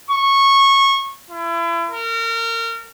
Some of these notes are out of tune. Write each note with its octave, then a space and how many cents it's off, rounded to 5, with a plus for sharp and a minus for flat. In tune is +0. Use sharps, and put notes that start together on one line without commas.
C#6 -15
E4 +35
A#4 -30